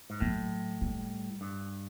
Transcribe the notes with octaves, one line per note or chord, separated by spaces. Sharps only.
G#2
A2 F#3
G3
G2